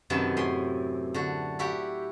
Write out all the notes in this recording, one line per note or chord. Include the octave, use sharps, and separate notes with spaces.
F#2 C3 D#3 B3 A5
A2 G#5 C6
D3 F#4
E4 F#4 G4